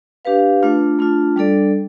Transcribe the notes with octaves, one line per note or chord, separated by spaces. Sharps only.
D4 G4 B4 F5
A3 D4 F4
A3 D4 F4
G3 D4 A4 D5